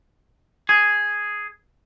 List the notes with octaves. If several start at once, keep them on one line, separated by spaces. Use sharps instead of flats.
G#4